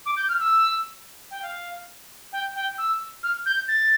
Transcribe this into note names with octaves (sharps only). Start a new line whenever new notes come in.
D6
G6
F6
E6
G5
F5
G5
G5
E6
F6
G6
A6